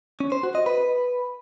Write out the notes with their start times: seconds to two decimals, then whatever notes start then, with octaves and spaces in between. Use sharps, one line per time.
0.20 C#4
0.32 C5
0.43 F#4
0.55 D#5
0.66 B4